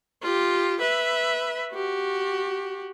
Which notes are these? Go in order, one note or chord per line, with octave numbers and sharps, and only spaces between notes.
F4 G4
B4 E5
F#4 G4